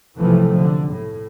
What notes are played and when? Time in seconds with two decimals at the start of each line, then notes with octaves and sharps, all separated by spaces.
0.18 B1 C3 E3 F3 A3
0.54 D3
0.91 A2